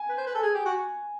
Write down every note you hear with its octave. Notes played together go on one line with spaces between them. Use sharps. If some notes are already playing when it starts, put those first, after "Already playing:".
Already playing: G#5
B4
C5
B4
A4
G#4
G4
F#4